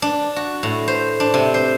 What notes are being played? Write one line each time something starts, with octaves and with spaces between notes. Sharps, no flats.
D4
F#4
A2
C5
D4
C3
C5